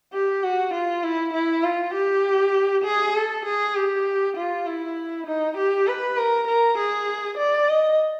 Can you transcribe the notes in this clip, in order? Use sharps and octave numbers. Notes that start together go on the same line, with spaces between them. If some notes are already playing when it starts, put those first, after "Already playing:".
G4
F#4
F4
E4
E4
F4
G4
G#4
A4
G#4
G4
F4
E4
D#4
G4
B4
A#4
A#4
G#4
D5
D#5